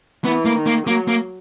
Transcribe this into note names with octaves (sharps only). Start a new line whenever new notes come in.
E3 B3
A#3
D#3
A#3
F#3 A#3
A#3